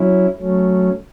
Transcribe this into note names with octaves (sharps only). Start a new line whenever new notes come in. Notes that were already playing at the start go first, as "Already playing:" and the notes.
Already playing: F#3 C#4 E4
F#3 A3 C#4